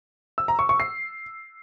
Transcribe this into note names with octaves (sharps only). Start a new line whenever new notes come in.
E6
A#5
C#6
C#6
C7